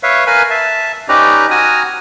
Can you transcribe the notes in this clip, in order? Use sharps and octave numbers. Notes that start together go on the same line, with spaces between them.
B4 C#5 E5 F5
A#4 B4 F5 G#5 B5
E5 A5
C#4 D#4 G4 B4 D5 A#5
F#4 G#5 A#5 D#6 F6